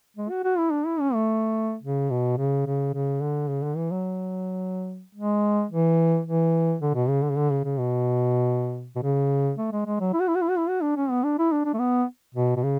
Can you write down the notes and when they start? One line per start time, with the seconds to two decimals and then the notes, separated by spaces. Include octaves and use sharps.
0.17 G#3
0.30 F#4
0.44 F#4
0.58 E4
0.72 D4
0.86 E4
1.00 C#4
1.14 A3
1.83 C#3
2.10 B2
2.38 C#3
2.66 C#3
2.94 C#3
3.21 D3
3.48 C#3
3.63 D3
3.76 E3
3.91 F#3
5.15 G#3
5.71 E3
6.26 E3
6.81 D3
6.95 B2
7.09 C#3
7.23 D3
7.30 C#3
7.37 D3
7.51 C#3
7.64 C#3
7.79 B2
8.96 B2
9.03 C#3
9.58 A3
9.72 G#3
9.86 G#3
10.00 F#3
10.13 E4
10.20 F#4
10.28 E4
10.35 F#4
10.42 E4
10.50 F#4
10.58 E4
10.69 F#4
10.82 D4
10.97 C#4
11.10 B3
11.24 D4
11.39 E4
11.52 D4
11.65 D4
11.73 A3
11.79 B3
12.35 B2
12.56 B2
12.63 C#3